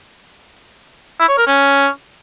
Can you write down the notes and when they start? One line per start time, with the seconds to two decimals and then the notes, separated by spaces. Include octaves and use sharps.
1.20 E4
1.29 C#5
1.38 A#4
1.47 C#4